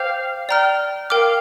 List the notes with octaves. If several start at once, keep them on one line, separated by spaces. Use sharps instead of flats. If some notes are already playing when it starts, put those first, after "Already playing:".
Already playing: C5 F5 G5 D6 G6
D5 G5 A#5 F6
A#4 F5 G5 D6 F6